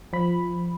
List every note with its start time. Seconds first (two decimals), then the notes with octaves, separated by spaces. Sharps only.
0.13 F3 B5